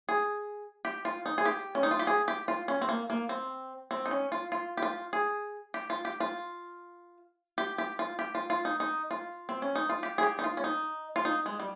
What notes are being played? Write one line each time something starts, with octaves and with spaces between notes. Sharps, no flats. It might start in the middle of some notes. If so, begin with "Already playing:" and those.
G#4
G4
F4
D#4
G#4
G4
C#4
D#4
F4
G4
G#4
G4
F4
C#4
C4
A#3
A#3
C4
C4
D#4
C#4
F4
F4
G4
F4
G#4
G4
F4
G4
F4
G4
G4
F4
G4
F4
F4
D#4
D#4
F4
C4
C#4
D#4
F4
G4
G#4
G4
D#4
F4
C#4
D#4
F4
D#4
G#3
G3